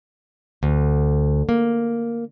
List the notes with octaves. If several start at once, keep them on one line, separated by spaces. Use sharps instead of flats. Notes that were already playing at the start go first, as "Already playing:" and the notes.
D2
A#3